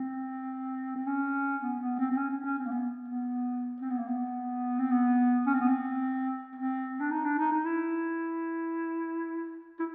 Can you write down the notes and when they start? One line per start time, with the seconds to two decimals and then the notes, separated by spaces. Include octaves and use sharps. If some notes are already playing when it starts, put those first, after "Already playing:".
Already playing: C4
0.96 C4
1.07 C#4
1.62 B3
1.80 B3
1.99 C4
2.11 C4
2.17 C#4
2.30 C#4
2.44 C#4
2.58 C4
2.66 A#3
2.71 B3
3.08 B3
3.81 C4
3.90 B3
3.99 A#3
4.08 B3
4.79 C4
4.91 B3
5.46 C#4
5.54 C4
5.60 B3
5.68 C4
6.55 C4
7.00 D4
7.11 D#4
7.24 D4
7.38 D#4
7.52 D#4
7.65 E4
9.79 E4